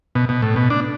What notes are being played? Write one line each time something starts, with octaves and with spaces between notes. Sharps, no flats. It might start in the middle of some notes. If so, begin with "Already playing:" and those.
B2
B2
A2
B2
D4